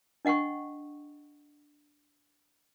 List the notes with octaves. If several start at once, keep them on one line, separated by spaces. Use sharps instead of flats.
D4 D#5 F#5 G5 C#6